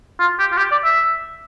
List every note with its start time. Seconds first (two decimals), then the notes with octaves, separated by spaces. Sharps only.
0.20 F4
0.39 G4
0.52 F4
0.58 G4
0.72 D5
0.84 E5